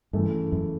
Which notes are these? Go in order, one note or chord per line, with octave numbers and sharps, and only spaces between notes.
G2 C#3 E3 A3
F#2